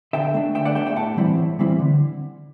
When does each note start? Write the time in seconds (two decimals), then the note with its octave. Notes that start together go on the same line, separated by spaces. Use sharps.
0.13 D3 E5 G5
0.34 A3 D4
0.55 D3 E5 G5
0.65 D5 F#5
0.75 A3 E5 G5
0.79 D4
0.86 E5 G5
0.96 A2 F#5 A5
1.17 E3 G3 C4 E4
1.37 A2
1.59 E3 G3 C4 E4
1.79 D3